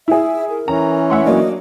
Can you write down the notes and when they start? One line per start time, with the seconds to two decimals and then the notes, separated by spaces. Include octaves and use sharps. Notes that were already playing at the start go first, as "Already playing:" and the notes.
0.08 E4 G#4 E5
0.49 A#4
0.68 E3 C#4 A#5
1.10 A3 E5 F#5 C6
1.25 F#3 A#3 D4 D#5